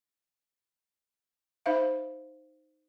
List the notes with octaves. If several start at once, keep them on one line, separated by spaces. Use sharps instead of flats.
D#4 C5 E5 F5